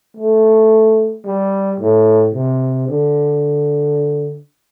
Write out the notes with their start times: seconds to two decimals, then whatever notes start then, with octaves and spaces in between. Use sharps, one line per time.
0.17 A3
1.25 G3
1.80 A2
2.35 C3
2.89 D3